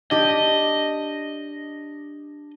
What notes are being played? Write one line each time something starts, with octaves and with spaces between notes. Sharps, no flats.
D4 G4 D#5